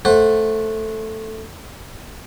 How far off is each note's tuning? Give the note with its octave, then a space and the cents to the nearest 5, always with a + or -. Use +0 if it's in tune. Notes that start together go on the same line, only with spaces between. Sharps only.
A3 +0 C5 +10 F#5 -10